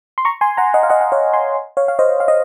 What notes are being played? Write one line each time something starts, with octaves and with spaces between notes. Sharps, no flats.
C6
A#5 C#6
G#5 C6
F#5 A#5
D#5 F#5
F5
D#5 F#5
F#5
C#5 F5
G#5 C6
C#5 F5
F5
C5 D#5
F5
D#5